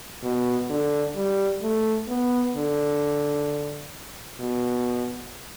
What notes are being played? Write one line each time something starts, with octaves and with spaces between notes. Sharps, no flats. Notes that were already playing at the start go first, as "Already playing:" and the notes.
B2
D3
G3
A3
B3
D3
B2